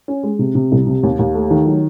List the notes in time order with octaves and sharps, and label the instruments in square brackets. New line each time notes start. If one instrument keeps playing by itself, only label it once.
[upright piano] C#4
G#3
C3
C3
C2
C3
D#2
D#2
A3
D#3
F#3